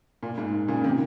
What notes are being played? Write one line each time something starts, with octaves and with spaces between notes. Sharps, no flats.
A#2
G#2
A#2 C#3
C3 D#3